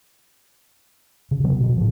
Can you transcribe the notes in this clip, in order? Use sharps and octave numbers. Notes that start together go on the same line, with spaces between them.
C#3
C3 F#3 B3
B2
A2 F3